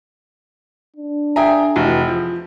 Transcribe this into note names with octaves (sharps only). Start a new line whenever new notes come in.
D4
G#4 E5 G5 G#5 A#5
F1 E3 F#4
F3